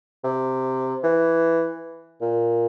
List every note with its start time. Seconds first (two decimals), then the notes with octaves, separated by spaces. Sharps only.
0.24 C3
1.03 E3
2.21 A#2